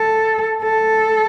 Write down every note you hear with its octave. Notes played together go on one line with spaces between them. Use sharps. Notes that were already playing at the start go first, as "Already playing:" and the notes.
Already playing: A4
A4